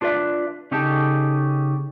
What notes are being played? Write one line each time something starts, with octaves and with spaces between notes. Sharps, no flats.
D4 F4 B4 D5 E5
C#3 C#4 D#4 G4 A4 A5